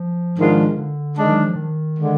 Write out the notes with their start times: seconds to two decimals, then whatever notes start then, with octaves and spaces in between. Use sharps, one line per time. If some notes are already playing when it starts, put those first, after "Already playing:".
Already playing: F3
0.38 G#2 D#3 G#3 D4 F4
0.77 D3
1.16 D#3 G#3 D4
1.30 F#3
1.43 F3
1.56 D#3
1.97 D3 G#3